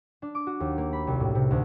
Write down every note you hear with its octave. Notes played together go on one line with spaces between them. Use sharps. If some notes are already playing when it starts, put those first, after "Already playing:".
D4
D6
F#4
D#2
A#3
B5
C2
A2
C3
D2